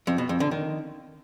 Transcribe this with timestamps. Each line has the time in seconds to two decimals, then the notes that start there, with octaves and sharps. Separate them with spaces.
0.07 F2
0.18 B2
0.29 F2
0.40 D3
0.51 D#3